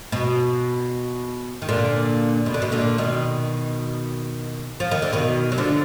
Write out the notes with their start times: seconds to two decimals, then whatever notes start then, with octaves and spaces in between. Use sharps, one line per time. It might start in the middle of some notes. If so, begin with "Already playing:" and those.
0.12 B2
1.62 D#3
1.69 A#2 D3
2.46 B2
2.54 D3
2.62 B2
2.72 A#2 D3
2.98 B2 D#3
4.80 F3
4.91 D#3
5.02 D3
5.13 B2 D#3
5.52 F#3
5.58 D3 F3